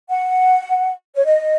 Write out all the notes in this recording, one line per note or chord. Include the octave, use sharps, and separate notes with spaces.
F#5
C#5
D#5